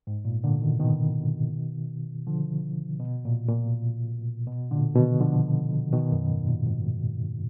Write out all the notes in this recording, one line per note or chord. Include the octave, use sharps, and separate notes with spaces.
G#2
A#2
A#2 D3
B2 D#3
B2 D#3
D3 F3
B2
A#2
A#2
B2
A#2 D3
B2 D#3
D3 F3
B2 D#3
F#2
G#2
A#2
G#2